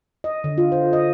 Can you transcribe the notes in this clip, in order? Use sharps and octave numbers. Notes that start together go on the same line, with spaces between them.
D#5
D3
F4
C5
D#5